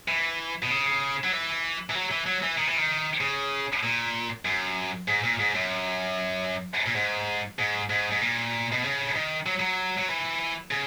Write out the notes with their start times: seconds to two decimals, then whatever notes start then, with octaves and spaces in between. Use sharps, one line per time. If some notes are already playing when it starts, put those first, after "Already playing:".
0.08 E3
0.63 B2
0.70 C#3
1.24 F#3
1.32 E3
1.90 E3
1.95 F#3
2.11 E3
2.26 F#3
2.43 E3
2.58 D#3
2.67 E3
2.77 D#3
3.21 C#3
3.83 A#2
4.45 F#2
5.08 G#2
5.24 A#2
5.39 G#2
5.55 F#2
6.86 A#2
6.95 G#2
7.59 G#2
7.90 G#2
8.11 G#2
8.21 A#2
8.72 B2
8.84 C#3
9.15 D#3
9.46 F#3
9.60 F#3
9.98 F#3
10.09 E3
10.71 C#3